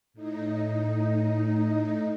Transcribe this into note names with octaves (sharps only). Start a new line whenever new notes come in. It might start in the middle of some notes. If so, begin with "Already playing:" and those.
A2 D#4